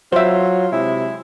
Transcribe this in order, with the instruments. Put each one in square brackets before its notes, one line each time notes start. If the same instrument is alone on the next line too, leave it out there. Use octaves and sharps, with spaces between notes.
[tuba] F#3 [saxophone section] F4 [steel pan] C5 E5
[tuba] C3 [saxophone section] G#3 E4